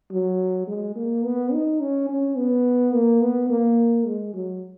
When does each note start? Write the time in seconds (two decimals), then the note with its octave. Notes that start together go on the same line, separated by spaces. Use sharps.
0.12 F#3
0.67 G#3
0.96 A#3
1.25 B3
1.53 D#4
1.80 C#4
2.09 C#4
2.37 B3
2.94 A#3
3.21 B3
3.50 A#3
4.06 G#3
4.34 F#3